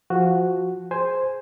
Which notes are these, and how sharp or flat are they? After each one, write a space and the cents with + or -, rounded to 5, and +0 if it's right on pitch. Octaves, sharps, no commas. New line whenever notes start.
F3 -5 F#4 +0
G#4 +0 C5 +0 G#5 -5